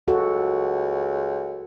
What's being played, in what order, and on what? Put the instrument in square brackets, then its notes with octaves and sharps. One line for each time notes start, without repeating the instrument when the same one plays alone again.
[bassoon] C#2 [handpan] F#4 A4